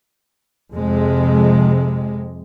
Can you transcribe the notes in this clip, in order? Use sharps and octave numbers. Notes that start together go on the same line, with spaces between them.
F2 C3 G#3